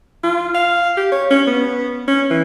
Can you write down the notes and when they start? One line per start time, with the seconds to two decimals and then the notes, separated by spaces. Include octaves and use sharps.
0.24 F4
0.55 F5
0.97 G4
1.12 C#5
1.31 C#4
1.47 B3
2.08 C#4
2.30 E3